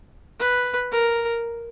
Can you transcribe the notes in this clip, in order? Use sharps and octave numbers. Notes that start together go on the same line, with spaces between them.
B4
A#4